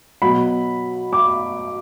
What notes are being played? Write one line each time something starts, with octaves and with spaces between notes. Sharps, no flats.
B2 F#3 B5
D6